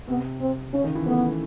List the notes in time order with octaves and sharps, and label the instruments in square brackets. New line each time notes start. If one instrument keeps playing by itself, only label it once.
[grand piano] C3 [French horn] B3
[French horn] C4
[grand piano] C#3 [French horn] C#4
[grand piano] D#3
E3
[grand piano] A3 [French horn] B3